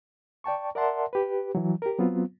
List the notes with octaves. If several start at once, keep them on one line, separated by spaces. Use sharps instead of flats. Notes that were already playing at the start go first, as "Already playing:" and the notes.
D5 G5 A5 C#6
A#4 D5 E5 F#5 A5 C6
G4 B4
E3 F#3
G4 A#4
F#3 B3 C4 F4